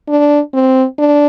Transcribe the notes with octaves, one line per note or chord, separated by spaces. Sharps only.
D4
C4
D4